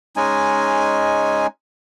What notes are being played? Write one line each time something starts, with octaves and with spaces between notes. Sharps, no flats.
G#3 C#4 D#4 G#5